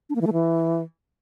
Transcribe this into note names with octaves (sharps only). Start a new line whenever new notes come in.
D4
A#3
E3
A3
E3